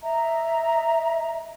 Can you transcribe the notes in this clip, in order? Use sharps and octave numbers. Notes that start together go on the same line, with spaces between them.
D#5 E5 A#5